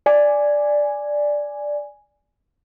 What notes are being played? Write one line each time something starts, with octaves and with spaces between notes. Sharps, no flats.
D5 G#5